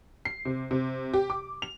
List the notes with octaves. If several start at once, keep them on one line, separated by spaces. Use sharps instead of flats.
C7
C3
C3
G4
D6
F7